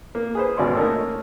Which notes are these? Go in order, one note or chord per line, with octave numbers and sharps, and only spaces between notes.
A#3
G#4 B4 C5
G#1 B2 C#4 D5 C6
A3 A#3 C#4 D#4 A#4